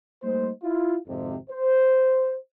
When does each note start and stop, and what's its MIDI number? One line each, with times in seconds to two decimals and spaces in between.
0.23 0.49 55
0.23 0.49 57
0.23 0.49 58
0.23 0.49 63
0.23 0.49 72
0.63 0.96 64
0.63 0.96 65
1.07 1.36 32
1.07 1.36 41
1.07 1.36 48
1.50 2.35 72